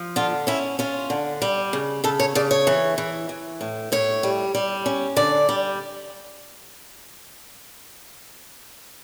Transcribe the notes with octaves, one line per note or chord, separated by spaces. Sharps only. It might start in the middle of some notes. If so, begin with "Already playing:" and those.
Already playing: F3
D3 F4
C#4 E4
C#4 F4
D3
G3
C#3
C#3 A4
C#5
C#3 D5
C#5
E3
E3
E3
A2
A2 C#5
G3
G3
C#4
D3 D5
G3